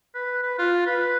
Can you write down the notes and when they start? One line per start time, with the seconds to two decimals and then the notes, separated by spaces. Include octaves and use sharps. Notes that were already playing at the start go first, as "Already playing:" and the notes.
0.15 B4
0.42 B4
0.58 F4
0.87 B4